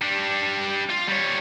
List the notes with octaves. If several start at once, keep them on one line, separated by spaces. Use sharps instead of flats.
G3 D4
F4
G3 C#5